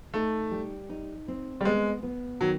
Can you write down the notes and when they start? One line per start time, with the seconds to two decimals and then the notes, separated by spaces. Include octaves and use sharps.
0.14 A3 D#4
0.51 G3
0.89 D#4
1.28 C4
1.61 G3
1.65 G#3 B3
2.03 B3
2.41 D#3 F#3